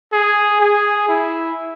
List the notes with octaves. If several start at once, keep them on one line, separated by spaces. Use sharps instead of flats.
G#4
G#4
E4